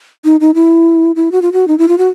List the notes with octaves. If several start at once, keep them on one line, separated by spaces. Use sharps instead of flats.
D#4
D#4
E4
E4
F#4
F4
F#4
D#4
E4
F4
F#4